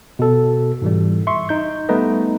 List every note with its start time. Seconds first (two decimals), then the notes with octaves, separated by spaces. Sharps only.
0.19 B2 A4
0.82 G#2 E3 G3
1.27 E5 C6 C#6
1.49 D#4 G6
1.89 G3 A3 B3 D#4 B4 D#5